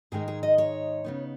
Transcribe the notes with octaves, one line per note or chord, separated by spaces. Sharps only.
G#2 D#3 G#3 D#4 G#4
G#4
D#5
C#5
C#3 B3 D#4